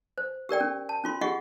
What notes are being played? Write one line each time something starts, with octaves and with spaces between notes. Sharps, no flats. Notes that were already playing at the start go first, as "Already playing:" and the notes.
C5
G4 A#4 D5 G5
C#4
A5
C#4 F4 C6
F4 G4 G#4 D#5 F#5 C#6